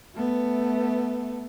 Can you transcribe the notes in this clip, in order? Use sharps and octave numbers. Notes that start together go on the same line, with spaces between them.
A3 B3